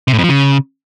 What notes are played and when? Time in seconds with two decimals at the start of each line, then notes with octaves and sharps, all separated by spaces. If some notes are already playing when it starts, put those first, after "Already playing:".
0.08 C3
0.13 A2
0.18 F2
0.24 F3
0.29 C#3